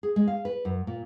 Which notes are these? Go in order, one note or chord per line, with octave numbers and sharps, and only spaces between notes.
G#4
G#3
F5
B4
F#2
A#2